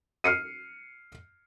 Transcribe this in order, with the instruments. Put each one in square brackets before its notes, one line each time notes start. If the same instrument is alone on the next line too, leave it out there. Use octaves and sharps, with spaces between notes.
[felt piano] F6 C7 C#7 D#7